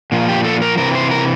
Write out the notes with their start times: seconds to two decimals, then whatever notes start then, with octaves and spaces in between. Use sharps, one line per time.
0.12 A#2 F3
0.28 G4
0.44 A4
0.62 A#4
0.77 C3 E3 A#4
0.95 C5
1.11 A#4